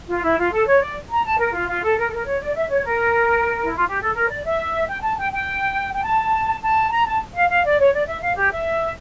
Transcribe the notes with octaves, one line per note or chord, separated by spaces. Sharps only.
F4
E4
F4
A4
C#5
D5
A#5
A5
A#4
F4
F4
A4
A#4
A4
A#4
C#5
D5
E5
C#5
A#4
E4
F4
G4
A4
A#4
D5
E5
G5
A5
G5
G5
G5
A5
A5
A#5
A5
F5
F5
D5
C#5
D5
E5
F5
G4
E5